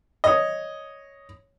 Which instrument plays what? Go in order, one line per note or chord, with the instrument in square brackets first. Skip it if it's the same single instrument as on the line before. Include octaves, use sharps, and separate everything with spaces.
[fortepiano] C#5 D#5